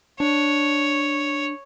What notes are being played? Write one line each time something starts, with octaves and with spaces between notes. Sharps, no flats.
D4 C#5